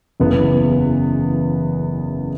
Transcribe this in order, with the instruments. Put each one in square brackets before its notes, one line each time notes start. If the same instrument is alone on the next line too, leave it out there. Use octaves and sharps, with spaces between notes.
[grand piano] F#1 E2 C#3 E3 B3